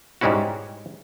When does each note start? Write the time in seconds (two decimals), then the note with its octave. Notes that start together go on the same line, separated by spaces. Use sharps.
0.21 G#2 G3 G#3 C#4 E4 F#4